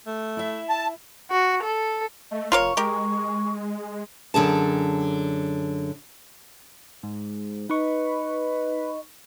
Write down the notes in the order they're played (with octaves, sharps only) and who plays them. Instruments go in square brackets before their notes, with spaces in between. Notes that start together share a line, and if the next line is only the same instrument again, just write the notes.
[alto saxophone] A3
[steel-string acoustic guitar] E4 E5
[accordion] A5
[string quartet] F#4
A4
[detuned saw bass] A3 [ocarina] D#5
[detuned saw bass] F1 [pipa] F4 A#4 C#5 [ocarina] C#6
[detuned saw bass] G#3 [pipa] G4 A#4
[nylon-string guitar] F#2 D3 G#4 A5
[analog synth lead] G#2
[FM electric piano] D#4 C#6 [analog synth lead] B4 [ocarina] D#5